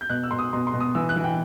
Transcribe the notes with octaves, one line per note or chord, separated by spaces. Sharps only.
G6
B2 F#6
E6
B2 C6
D#6
B2 C6
C6
B2
D#6
E3 E6
F#6
E3
G5